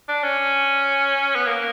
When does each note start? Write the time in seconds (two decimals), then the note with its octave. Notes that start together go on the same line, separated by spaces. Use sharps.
0.09 D4
0.24 C#4
1.36 B3
1.47 A#3